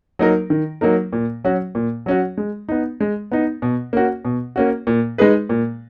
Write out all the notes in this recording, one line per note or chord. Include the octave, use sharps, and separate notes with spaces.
F#3 A#3 D#4 A#4
D#3
F#3 A#3 D#4 A#4
A#2
F#3 C#4 F#4
A#2
F#3 C#4 F#4
G#3
B3 D#4
G#3
B3 D#4
B2
A#3 C#4 F#4
B2
A#3 C#4 F#4
A#2
G#3 D#4 G#4 B4
A#2